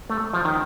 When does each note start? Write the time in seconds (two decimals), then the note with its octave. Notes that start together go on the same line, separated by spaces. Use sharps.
0.10 A3
0.33 F3
0.45 D#3